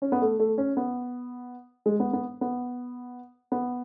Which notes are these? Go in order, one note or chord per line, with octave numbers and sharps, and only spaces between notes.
C#4
B3
A3
A3
C#4
B3
G#3
B3
B3
B3
B3